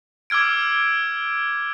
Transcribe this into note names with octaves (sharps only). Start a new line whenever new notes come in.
D6 E6 F6 G#6 D7